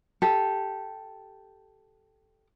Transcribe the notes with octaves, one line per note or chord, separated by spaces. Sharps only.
G4 A4